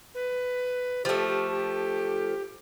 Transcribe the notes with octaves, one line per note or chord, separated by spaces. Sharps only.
B4
F3 A3 G4
G4
G4